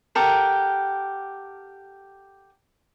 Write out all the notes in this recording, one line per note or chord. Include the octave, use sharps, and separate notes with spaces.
G4 A4 A#4 F#5